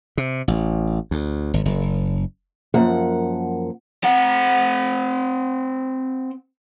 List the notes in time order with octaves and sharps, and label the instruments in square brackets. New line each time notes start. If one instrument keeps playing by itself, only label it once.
[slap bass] C3
A1
D2
G#1
F#1
[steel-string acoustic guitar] F#2 F3 A#3 F#5
[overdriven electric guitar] C4 F#5